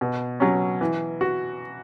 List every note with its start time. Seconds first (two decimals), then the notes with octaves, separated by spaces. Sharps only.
0.01 B2
0.40 F#3 C#4
0.81 E3
1.21 F#4